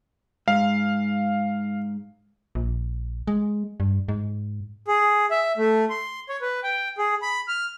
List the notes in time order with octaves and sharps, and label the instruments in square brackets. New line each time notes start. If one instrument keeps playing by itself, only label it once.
[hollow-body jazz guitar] G#2 [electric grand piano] F5
[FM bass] A#1
G#3
G2
G#2
[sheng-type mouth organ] G#4
E5
A3
C6
C#5
B4
G5
G#4
B5
F6